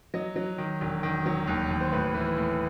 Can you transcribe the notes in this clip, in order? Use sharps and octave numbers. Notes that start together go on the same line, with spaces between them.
F#3 D#5
F#3
D#3
E1
D#3
F#3
D#2
D#2
C5
A2 B4
E3
A2